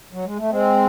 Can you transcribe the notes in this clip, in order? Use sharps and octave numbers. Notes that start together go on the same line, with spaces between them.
F#3
G#3
A3
G#3 C4